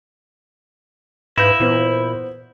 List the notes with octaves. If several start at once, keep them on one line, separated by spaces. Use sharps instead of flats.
G#2 E4 B4 F5 G6 A#6
A#2 E3 B3 C5